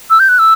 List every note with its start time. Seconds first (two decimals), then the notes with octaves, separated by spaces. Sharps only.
0.10 E6
0.20 G6
0.29 F#6
0.39 E6